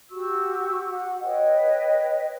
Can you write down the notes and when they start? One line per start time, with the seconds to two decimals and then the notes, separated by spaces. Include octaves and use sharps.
0.10 F#4 G4 C#6 E6
0.89 F#5
1.22 B4 C#5 D#5 G5